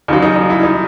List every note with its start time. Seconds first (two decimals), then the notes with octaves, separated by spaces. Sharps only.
0.08 D#2 C#3 F#3 D#4
0.22 D#4
0.36 D#4
0.50 E4
0.63 D#4